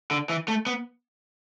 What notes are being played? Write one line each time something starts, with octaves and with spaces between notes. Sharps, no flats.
D3
E3
A3
B3